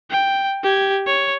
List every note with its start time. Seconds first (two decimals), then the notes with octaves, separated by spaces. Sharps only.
0.11 G5
0.63 G4 G#6
1.07 C#5